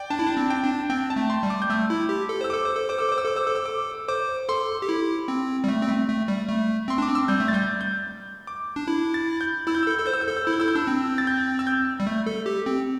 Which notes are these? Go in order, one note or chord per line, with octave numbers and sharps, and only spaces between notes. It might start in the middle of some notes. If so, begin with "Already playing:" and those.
Already playing: D5 G5
D4 A5
E4
D4
C4
G5
D4
C4 G5
A5
A3
C6
G3
D6
G6
A3 E6
E4
G4
A4
C5 E6
A4 D6
C5
A4
C5 D6
A4 E6
C5 D6
E6
A4 D6
C5 E6
A4 D6
E6
D6
C5 D6
A4 C6
G4
E4
C4
G3
A3
C4
A3
A3
G3
A3
C4 C6
D4 D6
C4
E6
G3 G6
A3
A6
G3 G6
G6
D6
D4
E4
A6
G6
E4 E6
G6
E6
A4
G6
A4 E6
C5 G6
E6
G6
A4 E6
G6
E4 E6
G6
E4 E6
G6
D4 E6
C4
A6
G6
E6
G6
G3
A3
A4
G4
C4